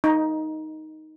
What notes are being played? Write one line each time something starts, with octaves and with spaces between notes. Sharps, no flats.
D#4